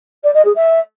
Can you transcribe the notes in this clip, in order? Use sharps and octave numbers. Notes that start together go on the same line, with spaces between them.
D5
D#5
G#4
E5